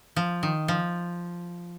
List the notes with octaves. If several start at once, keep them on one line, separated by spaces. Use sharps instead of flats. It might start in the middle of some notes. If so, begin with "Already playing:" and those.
F3
D#3
F3